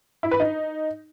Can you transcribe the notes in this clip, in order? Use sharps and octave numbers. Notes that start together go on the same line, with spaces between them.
E4
B4
D#4